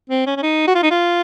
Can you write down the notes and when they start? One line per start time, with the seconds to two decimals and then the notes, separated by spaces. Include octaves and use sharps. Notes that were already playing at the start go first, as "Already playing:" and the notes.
0.10 C4
0.26 C#4
0.37 C#4
0.42 D#4
0.67 F#4
0.75 F4
0.83 D#4
0.91 F4